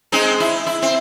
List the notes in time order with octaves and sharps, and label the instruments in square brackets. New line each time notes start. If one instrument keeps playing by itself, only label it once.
[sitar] G#3 C4 D#4
E4
E4
C4